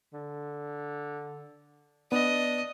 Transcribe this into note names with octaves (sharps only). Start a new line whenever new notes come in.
D3
B3 D4 D#5